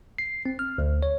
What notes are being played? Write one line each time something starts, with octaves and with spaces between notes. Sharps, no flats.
C7
C4
F6
D2
C#5